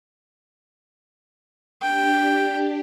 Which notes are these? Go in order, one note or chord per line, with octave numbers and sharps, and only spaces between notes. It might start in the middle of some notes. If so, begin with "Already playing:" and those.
D4 G4 G5